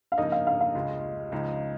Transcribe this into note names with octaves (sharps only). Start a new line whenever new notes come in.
F5
F2 C#3 A#3 D#4 D#5
F5
F5
F5
C#2 C#3 G#3 F4
C#2 C#3 F3 G#3 D#4